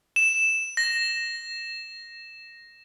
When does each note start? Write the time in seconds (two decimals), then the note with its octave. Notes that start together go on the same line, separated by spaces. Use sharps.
0.16 E7
0.77 A#6